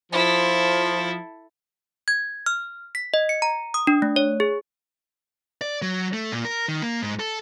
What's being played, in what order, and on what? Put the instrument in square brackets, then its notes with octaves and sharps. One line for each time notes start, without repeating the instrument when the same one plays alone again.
[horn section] F3 [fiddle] E4 A4
[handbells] G#6
F6
B6
D#5
C#7
A#5
D#6
D4
A3
C#5
G#4
[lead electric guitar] D5
F#3
A3
A#2
A#4
D#3
A#3
G#2
A4